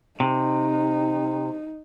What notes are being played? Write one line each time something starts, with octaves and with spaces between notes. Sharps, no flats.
C3 D#4